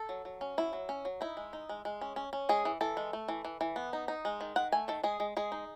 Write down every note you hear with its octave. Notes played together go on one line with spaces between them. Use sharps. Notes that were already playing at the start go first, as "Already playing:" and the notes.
Already playing: A4
F#3
F#3
C#4
F#3 E4
F#3
C#4
F#3
D#4 E4
G#3
D#4
G#3
G#3
C#4
C#4
C#4
G#3 G#4
E3
E3 A4
G#3
A3
E3
E3
E3
B3
D#4
D#4
G#3
D#3
D#3 F#5
A3 G#5
D#3 A4
G#3 G#4
G#3
G#3 G#4
D#4